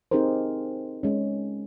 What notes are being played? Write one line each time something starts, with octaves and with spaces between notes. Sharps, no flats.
C4 D#4 G4 G#4 A#4 C5
G#3 C#4